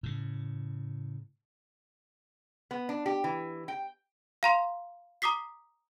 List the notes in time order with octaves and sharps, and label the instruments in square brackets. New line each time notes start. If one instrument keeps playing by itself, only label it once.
[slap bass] A2 C#3
[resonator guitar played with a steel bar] B3
D4
G4
E3
G5
[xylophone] F5 A#5 C6
A#5 D6 D#6 B6 C7